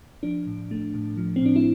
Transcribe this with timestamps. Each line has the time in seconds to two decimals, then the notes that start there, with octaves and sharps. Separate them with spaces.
0.23 F3 D4
0.46 A2
0.71 A3
0.95 A2
1.17 F3
1.36 C4
1.42 A2 D4
1.56 E4